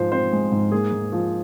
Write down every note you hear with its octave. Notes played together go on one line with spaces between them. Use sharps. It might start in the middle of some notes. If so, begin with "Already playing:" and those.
Already playing: G#2 F3 G#3 C5
C4 C5
G#3
G#2
A#3 G#4
G#2
F3